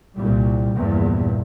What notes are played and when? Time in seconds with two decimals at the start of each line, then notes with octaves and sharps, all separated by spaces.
0.14 C2 A#2 G3
0.75 A#1 E2 G2 A#2